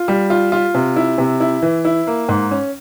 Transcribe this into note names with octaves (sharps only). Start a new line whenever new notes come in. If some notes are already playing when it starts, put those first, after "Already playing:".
Already playing: F4
G3
F4
F4
C3
E4
C3
E4
E3
E4
A#3
G#2
C#4